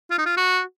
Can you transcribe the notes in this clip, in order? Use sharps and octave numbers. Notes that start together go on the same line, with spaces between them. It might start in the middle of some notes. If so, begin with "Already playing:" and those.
F4
D#4
F4
F#4